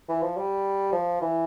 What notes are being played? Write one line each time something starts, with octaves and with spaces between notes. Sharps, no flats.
E3
F3
G3
F3
E3